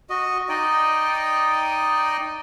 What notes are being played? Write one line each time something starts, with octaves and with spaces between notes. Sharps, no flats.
F#4 D#5
D#4 D5 D#5 G5